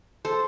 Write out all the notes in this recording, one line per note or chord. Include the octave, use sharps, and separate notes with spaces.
A4 C5